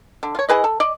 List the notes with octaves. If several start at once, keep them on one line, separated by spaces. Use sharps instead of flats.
D3
F4 C#5
E3 G#4 B4 D#5
A4
D5 D#5